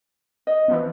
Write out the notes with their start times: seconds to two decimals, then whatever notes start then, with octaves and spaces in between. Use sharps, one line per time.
0.47 D#5
0.68 E3 F3 B3